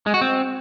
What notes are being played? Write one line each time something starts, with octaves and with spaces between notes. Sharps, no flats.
G#3
F#4
C4